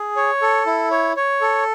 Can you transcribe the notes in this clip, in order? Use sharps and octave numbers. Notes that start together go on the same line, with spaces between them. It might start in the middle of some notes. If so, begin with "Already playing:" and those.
Already playing: G#4
C#5
A4
E4
C#5
C#5
A4